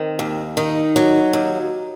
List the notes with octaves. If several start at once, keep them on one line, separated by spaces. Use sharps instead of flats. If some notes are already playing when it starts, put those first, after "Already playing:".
Already playing: D#3 C4
D#2
D#3 D#4
F#3
D#2